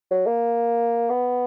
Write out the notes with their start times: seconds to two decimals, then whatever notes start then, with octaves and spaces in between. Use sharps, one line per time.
0.11 F#3
0.27 A#3
1.10 B3